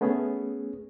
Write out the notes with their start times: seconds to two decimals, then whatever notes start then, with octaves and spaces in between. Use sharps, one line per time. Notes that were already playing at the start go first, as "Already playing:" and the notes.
0.01 A3 B3 C#4 G#4